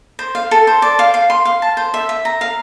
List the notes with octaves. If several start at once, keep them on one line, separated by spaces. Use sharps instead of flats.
C5
F5
A4
C5
D5
F5
F5
C6
F5
A5
C5
E5
E5
A#5
F5